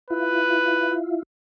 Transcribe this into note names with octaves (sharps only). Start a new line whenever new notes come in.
E4 F4 B4